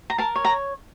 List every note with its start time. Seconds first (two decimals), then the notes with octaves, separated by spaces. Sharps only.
0.10 A#5
0.18 A#4 A5
0.36 C#5
0.45 A#5